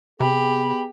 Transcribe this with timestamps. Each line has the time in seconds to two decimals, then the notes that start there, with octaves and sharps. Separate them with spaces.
0.20 C3 B3 G4 G#4 B5